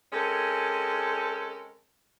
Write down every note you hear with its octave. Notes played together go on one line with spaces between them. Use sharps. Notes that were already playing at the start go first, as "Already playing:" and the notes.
G#3 C4 C#4 A4 A#4